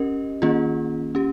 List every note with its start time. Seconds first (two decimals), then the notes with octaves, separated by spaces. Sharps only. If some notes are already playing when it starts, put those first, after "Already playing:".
Already playing: C#4 G4 A#4 D#5
0.42 D#3 A#3 C#4 F4 G#4
1.15 C#4 G4